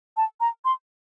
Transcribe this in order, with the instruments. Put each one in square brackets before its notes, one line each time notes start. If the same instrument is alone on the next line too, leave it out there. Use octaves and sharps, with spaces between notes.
[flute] A5
A#5
C6